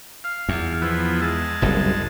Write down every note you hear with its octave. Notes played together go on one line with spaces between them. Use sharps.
F5
E2
F3 B3 E4
G#3 A5
F#1 C2 F#2